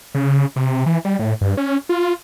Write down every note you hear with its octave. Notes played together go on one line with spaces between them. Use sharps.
C#3
C3
E3
G3
A2
G2
C#4
F4